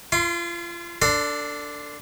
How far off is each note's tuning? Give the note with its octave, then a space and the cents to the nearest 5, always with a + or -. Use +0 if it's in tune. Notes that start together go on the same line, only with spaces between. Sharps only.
F4 -35 C6 +0
D4 -5 A4 +30 C6 -10